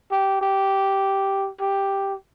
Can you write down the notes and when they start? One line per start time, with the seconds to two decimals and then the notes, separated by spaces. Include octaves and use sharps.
0.12 G4
0.42 G4
1.61 G4